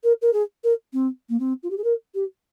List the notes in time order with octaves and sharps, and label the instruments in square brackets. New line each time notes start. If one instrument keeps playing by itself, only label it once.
[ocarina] A#4
A#4
G#4
A#4
C4
A#3
C4
F4
G4
G#4
A#4
G4